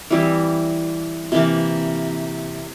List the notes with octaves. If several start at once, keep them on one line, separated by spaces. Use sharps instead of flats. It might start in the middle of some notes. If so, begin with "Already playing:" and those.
E3 G3 C4 E4
C3 E3 A#3